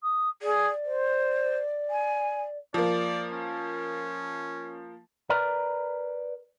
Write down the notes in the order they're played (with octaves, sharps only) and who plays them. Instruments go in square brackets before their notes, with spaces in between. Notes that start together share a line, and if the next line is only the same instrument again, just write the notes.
[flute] D#6
[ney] G#4 [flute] D5
[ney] C5
G#5
[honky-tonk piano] F3 A#3 [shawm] D5
[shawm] C#4
[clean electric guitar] A#4 B4 D5 A#5